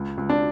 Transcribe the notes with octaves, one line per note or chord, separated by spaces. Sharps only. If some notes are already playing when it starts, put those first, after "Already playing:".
Already playing: C#2
C#2
D4